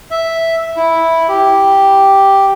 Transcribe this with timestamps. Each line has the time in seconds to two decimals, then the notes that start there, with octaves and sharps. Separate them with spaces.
0.11 E5
0.76 E4
1.29 G4